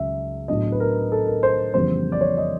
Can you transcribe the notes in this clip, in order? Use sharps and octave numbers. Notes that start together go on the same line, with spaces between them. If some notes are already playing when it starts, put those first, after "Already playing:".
Already playing: C#2 C#3 F#3 E5
A2 F#3 B3 D4 D#5
B4
A#4
A4
A#4
C5
F2 C#3 E3 G3 B3 C5
D5
C#5
D#5